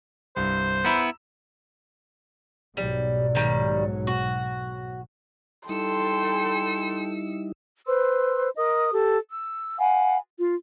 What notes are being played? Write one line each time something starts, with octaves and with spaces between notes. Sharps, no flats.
C2 G2 C5
B3 E4 A#5 B5 E6
B1 G#2 F#3 G3
D#3 G3
F#4
G3 D#4 E4 A4 G5 C6 E6 C#7
B4 C5 C6 E6
A#4 D#5 D#6
G4 A4
E6
F5 F#5 G#5 B5
F4